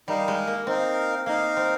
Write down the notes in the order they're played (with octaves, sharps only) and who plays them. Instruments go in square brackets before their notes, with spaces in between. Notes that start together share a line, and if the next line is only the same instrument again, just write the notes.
[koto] G3 [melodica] D#4 A#4 F5
[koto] G#3
A#3
[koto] C4 [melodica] D#4 A#4 F5
[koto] A#3 [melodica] D#4 A#4 F5
[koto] C4